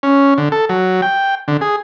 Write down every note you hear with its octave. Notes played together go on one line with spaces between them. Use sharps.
C#4
D3
A4
F#3
G5
D3
G#4